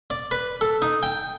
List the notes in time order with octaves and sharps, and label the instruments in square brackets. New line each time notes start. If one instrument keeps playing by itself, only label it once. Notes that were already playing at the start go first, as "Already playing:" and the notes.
[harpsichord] D5
B4
A4
D#4
G5